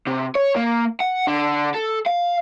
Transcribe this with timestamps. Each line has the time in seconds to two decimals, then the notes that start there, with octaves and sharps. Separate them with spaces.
0.07 C3
0.35 C#5
0.56 A#3
1.00 F#5
1.27 D3
1.74 A4
2.06 F5